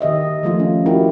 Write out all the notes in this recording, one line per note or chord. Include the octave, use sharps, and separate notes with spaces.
D#3 G4 D#5 E5
F3 A3 F4
C#4
E4 F#4 G4 A#4